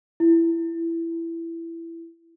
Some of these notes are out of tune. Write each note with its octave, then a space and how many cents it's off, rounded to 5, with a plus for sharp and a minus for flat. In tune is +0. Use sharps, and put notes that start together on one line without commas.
E4 +15